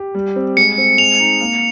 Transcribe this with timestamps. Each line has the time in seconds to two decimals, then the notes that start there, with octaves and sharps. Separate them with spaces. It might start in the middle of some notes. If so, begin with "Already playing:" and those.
Already playing: G4
0.15 G3
0.36 C4
0.57 G#3 C#7
0.78 C4
0.98 G#3 F7
1.20 D#4
1.40 A#3